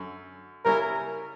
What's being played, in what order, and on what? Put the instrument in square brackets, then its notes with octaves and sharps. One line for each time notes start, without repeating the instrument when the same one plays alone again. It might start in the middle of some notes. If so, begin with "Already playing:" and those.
Already playing: [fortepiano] F#2 D3
[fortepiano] C#3 G3 C#4 E4 [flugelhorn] A#4